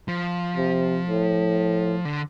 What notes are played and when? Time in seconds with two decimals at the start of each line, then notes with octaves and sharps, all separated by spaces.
0.08 F3
0.57 C3
1.07 A2
2.05 D3